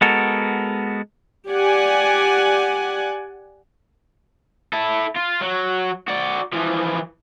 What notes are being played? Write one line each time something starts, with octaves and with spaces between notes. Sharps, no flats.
G#3 B3 F#4 A4 A#4
G4 D5 F#5 G#5
E4 A4
F4
F#3 F#4
F#4 D5
E3 F3